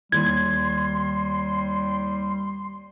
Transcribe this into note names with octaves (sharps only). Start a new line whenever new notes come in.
D#2 G3 C6 G#6